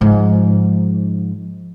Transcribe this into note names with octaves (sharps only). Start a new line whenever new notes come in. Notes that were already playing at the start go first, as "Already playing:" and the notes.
G#2 F3